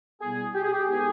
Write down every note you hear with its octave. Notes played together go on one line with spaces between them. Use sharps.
B2 G3 B3 E4 G#4
G4
G#4
G4
A2 E3 G#3 B3 D#4 G#4